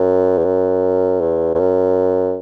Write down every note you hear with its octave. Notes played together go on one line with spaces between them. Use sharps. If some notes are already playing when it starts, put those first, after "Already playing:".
Already playing: F#2
E2
F#2
E2
E2
F#2